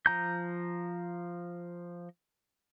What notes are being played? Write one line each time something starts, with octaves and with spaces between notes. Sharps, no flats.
F3 A#5 G6